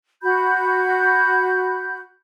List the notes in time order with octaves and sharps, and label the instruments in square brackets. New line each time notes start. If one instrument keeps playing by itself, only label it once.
[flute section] F#4 B5 G6